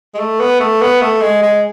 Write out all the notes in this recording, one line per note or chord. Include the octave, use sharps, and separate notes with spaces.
G#3
A3
B3
A3
B3
A3
G#3
G#3